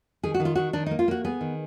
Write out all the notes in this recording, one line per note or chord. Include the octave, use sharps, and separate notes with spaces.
D#3 G#4
F#4
D#3
F4
D#3 F#4
D#3 D4
D#4
A#3
F4
A#3 F#4
B3 G#4
D#3